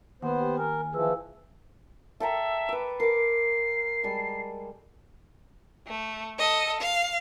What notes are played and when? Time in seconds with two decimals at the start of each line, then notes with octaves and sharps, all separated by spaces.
0.22 D#2 B3 C5 F#5
0.39 G4 G5
0.57 A#4 G#5
0.93 E3 F3 G#4 B4 E6
2.20 A4 E5 G5 A#5
2.69 B4 D6
3.00 A#4 D6 C7
4.03 G3 G#3 A4
5.87 A3
6.39 A4 D#5
6.81 F5